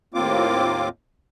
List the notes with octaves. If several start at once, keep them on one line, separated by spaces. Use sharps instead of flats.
D#2 A2 A#3 C4 F4 D6